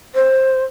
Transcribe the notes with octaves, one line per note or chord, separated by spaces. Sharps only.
C5